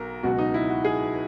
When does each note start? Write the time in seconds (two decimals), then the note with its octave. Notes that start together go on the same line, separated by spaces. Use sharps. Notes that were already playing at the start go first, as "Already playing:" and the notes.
Already playing: B1 F#3 A#4
0.23 C#2 B2 F#3 F#4
0.38 D#4
0.54 E4
0.70 F#4
0.85 G#4